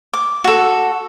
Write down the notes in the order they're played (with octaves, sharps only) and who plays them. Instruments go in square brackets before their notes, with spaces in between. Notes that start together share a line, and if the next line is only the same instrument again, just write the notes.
[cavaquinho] D6
F#4 A4